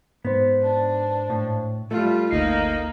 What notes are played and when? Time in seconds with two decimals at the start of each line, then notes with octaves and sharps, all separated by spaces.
0.25 G#2 B3 C5
0.63 D4
1.30 A2
1.91 G3 A3 F4
2.31 G1 D2 A#3 D#4 C7